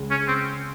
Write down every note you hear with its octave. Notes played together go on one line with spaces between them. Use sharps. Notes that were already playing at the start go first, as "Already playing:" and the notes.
Already playing: C#2 C#3 G#3
C#4
C4